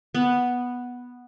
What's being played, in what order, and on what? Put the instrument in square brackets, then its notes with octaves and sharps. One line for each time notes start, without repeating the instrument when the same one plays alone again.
[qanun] B3